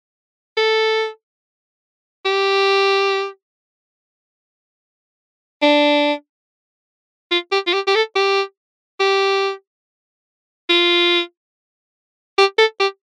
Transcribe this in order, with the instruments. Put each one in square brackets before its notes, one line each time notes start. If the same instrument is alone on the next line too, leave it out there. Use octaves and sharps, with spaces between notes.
[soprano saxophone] A4
G4
D4
F4
G4
F4
G4
G4
A4
G4
G4
F4
G4
A4
G4